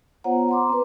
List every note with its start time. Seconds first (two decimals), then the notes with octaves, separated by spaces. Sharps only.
0.24 B3 F4 C5 C#5 F#5 A#5
0.49 A#5 C6 D6
0.69 C4 B4